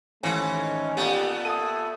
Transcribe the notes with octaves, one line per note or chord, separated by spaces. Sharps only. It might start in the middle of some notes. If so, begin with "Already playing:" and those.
D#2 G#2 E3 A3 C#4
D#5
A#2 A3 B3 G4
A4 E5 D#6 D#7